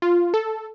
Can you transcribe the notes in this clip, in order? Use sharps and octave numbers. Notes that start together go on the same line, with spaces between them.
F4
A4